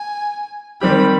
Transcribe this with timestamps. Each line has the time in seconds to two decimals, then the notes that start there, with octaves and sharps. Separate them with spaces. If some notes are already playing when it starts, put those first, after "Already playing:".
Already playing: G#5
0.81 D#3 G3 C4 G4 B5